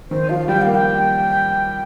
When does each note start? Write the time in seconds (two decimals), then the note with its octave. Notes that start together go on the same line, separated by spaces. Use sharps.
0.11 D#3 C5
0.29 F3 F5
0.48 G3 G5
0.62 A#3 F5
0.75 G5